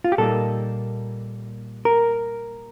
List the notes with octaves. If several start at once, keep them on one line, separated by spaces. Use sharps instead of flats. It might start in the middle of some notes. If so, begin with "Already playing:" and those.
F4
G4
A#2 G3 A#3 D#4 A4
A#4